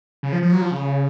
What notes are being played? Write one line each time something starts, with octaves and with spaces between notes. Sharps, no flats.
C#3
F3
F3
F#3
F3
C#3